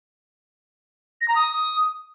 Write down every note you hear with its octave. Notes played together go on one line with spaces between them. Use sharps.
A#6
A#5
D#6